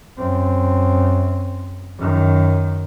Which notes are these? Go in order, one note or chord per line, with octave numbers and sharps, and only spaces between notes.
F#2 C4
F#2 D#3